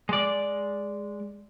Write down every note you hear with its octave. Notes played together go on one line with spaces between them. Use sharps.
G#3 D5